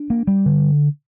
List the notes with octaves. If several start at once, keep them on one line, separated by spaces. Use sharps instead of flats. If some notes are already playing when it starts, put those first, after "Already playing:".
Already playing: D4
A#3
G3
D3